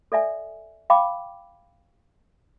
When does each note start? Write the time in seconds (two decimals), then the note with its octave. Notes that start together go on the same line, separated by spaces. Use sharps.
0.12 A4 D5 E5 G#5
0.90 F5 G5 B5 D6